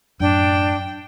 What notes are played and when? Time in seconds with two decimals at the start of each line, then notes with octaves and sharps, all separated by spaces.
0.20 F#2 A2 D4 G5